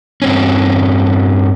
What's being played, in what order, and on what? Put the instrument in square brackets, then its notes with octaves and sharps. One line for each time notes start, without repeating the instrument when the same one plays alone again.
[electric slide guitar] G2 C4 C#4